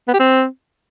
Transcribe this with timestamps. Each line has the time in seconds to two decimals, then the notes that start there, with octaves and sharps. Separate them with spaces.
0.08 B3
0.14 G4
0.19 C4